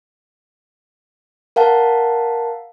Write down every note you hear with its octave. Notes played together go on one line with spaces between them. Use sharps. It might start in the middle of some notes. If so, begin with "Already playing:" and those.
A#4 F5 F#5 A5